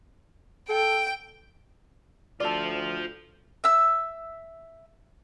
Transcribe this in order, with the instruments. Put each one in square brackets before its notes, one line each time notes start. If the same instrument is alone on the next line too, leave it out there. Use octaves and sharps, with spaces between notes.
[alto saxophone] A4 [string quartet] G5
[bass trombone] D2 [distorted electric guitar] F4 C5 [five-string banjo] A4 D5
[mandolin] E5 E6